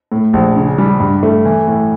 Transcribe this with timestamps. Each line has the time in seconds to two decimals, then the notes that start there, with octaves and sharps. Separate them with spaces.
0.12 A2
0.33 A#1
0.56 C#3
0.78 G3
1.00 G2
1.23 A3
1.45 E3
1.68 A2